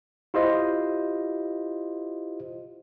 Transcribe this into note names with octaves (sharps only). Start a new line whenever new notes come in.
E4 F4 G4 C5 D#5